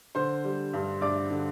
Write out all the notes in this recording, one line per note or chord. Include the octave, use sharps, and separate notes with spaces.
D3 C5 C6
G3
G2
G2 D5 D6
D3